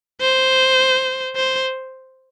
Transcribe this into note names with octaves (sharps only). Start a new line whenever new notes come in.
C5
C5